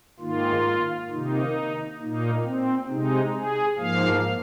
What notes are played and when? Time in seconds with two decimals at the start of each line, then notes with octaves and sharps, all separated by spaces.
0.20 G#2 D#3 A#3 F4
1.10 C3 D#3 A#3 D#4
1.99 A#2 A#3 D#4
2.44 C4
2.89 C3 G#3 D#4
3.34 G#4
3.78 G#2 F3 A#3 F5